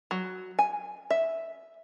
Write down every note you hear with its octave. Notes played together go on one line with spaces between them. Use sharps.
F#3
G#5
E5